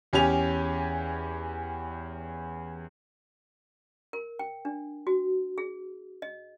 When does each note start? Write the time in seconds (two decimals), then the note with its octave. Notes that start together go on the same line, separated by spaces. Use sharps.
0.13 E2 C#4 G4 G#5 F7
4.13 A#4
4.39 G5
4.65 D4
5.07 F#4
5.58 G#4
6.22 D#5